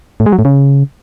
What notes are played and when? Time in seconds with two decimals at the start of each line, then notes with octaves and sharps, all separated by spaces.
0.20 A2
0.26 G#3
0.32 F#3
0.39 A2
0.45 C#3